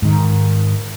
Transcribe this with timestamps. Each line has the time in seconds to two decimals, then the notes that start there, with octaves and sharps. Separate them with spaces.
0.02 G#2 D#3